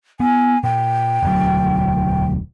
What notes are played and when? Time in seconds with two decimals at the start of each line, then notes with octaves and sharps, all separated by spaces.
0.20 B3 G#5
0.64 A#2 G5
1.23 E1 D2 F#3